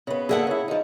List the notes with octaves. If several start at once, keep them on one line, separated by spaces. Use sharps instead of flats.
C#3 B3
D3 A#3 G#4 A4 E5 F#5
C#3 E4
F3 D#4